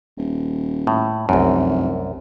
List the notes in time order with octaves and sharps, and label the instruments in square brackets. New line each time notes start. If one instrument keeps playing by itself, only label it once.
[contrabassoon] D#1
[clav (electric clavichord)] A2
[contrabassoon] F1 [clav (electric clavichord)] C2 F#2